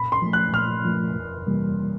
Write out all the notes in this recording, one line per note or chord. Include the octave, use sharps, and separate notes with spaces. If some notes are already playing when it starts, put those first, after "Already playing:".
Already playing: A#2 B5
C6
F3 A3
F#6
A#2 F6
F3 A3
F2
C3 E3 G3 A#3